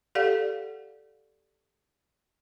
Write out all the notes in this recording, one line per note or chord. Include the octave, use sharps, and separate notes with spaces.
G4 A4 D5 F5 F#5